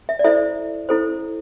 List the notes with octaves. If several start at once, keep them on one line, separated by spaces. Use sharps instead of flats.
E5
D5
E4 A4 C5 E5
E4 A4 C5